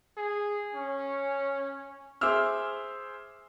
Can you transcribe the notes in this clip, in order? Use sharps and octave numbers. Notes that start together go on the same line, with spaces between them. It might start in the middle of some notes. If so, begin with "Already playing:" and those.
G#4
C#4
G#4 C5 E5 D6 E6 F6